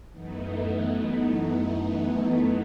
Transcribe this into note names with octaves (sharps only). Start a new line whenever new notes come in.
F#2 E3 A3 B3 D#4